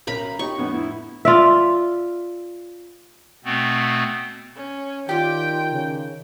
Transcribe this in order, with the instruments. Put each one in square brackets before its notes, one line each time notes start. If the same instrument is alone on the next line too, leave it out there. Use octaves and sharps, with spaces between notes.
[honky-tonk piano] B1 C#4 A#4 [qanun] A#5 B5
[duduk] D#4 [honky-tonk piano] G4 C#5 [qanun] C#6
[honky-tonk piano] F2 A2 D3 [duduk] B3
[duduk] E4
[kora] F4 D5 E5
[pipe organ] B2 A3 B3 C4
[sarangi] C#4
[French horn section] D#3 [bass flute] F4 [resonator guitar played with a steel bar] G4 D5 [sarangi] G5
[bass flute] C#3